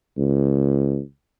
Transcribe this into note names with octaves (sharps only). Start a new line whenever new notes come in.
C#2